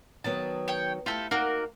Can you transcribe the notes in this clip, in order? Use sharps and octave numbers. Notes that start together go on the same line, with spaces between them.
D#3 F#3 B3 A5
C#5 G5
A3 E4 F4 G4 A4
A#3 D#4 F#4 A#4